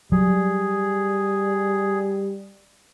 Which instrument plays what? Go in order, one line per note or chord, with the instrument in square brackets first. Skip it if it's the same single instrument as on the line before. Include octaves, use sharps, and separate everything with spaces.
[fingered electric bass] F#3 [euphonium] G3 [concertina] G#4